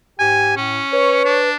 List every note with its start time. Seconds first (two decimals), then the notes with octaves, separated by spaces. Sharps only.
0.19 G#2 G4 G#5
0.57 A2 C#4
0.93 B4 C#5
1.25 D4